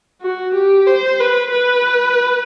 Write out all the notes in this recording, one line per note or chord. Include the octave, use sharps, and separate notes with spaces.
F#4
G4
C5
B4
B4